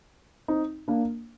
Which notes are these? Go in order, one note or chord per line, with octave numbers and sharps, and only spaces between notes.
C4 D#4
A#3 D4